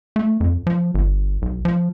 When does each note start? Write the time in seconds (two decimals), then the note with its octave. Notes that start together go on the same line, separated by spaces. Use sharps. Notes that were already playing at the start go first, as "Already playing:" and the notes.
0.16 A3
0.40 F2
0.67 F3
0.94 G1
1.42 B1
1.65 F3